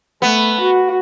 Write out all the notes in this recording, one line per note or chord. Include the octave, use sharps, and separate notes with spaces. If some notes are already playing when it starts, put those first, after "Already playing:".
A3 B3
F#4